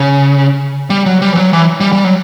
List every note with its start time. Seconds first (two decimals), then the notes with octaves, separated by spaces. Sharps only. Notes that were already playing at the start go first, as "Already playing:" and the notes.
Already playing: C#3
0.90 G3
1.06 F#3
1.22 G3
1.33 E3
1.37 F#3
1.53 E3
1.80 G3
1.92 G3
2.04 F#3